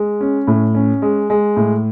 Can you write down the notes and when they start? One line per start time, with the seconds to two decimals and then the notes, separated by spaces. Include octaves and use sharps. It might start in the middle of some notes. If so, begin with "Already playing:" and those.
Already playing: G#3
0.21 C#4
0.47 A2
0.75 C#4
1.02 G#3
1.30 G#3
1.57 A2